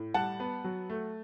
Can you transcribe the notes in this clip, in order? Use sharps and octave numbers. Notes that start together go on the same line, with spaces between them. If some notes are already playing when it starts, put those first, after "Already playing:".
Already playing: A2
G3 F#5 A5
B3
F#3
A3